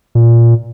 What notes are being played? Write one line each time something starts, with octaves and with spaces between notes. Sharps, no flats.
A#2